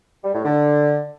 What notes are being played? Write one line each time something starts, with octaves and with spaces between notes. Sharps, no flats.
G3
A2
D3